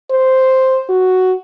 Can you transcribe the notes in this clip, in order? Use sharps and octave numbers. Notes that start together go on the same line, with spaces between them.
C5
F#4